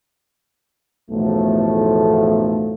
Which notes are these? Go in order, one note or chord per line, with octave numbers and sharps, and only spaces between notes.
B1 E2 A2 F3 A3